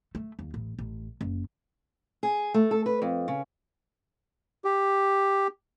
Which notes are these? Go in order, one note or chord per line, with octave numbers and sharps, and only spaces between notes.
A3
D#2
A1
A1
F#1
G#4
A3
A4
B4
F2
C#3
G4